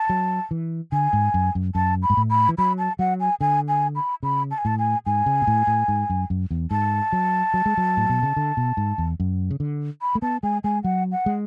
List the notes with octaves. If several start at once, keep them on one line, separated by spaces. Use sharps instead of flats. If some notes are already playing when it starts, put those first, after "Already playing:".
Already playing: A5
F#3
E3
D3 G#5
G#2
F#2
F#2
F#2 A5
B5
G#2
A2
B5
E3
F#3 B5
A5
F#3 F#5
G#5
D3 G#5
G#5
B5
C#3 B5
A5
G#5
A2 A5
G#5
G#2 G#5
C#3
B2
A2
A2
G#2
F#2
F#2
E2
G#2 A5
F#3
F#3
G#3
F#3
A2
B2
C#3
D3
B2
G#2
E2
F#2
C#3
D3
B5
A3
B3 A5
G#3 G#5
G#3 G#5
F#3 F#5
F#5
G#3